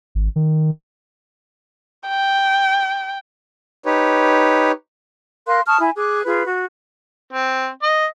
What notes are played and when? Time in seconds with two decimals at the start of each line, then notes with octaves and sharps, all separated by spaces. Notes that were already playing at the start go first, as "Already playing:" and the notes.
0.15 G#1
0.36 D#3
2.08 G5
3.85 D#4 G4 B4 C#5
5.47 A#4 F5 C6 F#6
5.66 A5 C#6 D#6 F6
5.80 E4 G#5
5.97 G#4 D6 F#6
6.25 F4 G#4 B4
6.45 F#4
7.33 C4
7.83 D#5